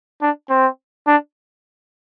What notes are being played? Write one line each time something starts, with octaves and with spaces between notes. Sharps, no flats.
D4
C4
D4